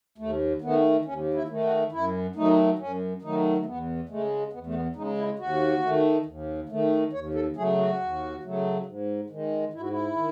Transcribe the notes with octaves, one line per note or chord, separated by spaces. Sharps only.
D#2 A3
D#3 A3 B3
D#2 C#4
E4
D#3 A3
F#4
F#2 E4
D#3 F#3 A3 D#4
F#2 C#4
D#3 F#3 A3 D#4
A3
E2 B3
C#3 G#3 A3
E2 B3
A3
B3
C#3 G#3 D#4
E4
D#2 F#4
D#3 A3
D#2
D#3 A3
D#2 C#5
A4
C#3 F#3 A3 G#4
F#4
D#2
C#3 F#3 A3
G#2
D#3 G#3
G#2 E4
F#4
E4
D#3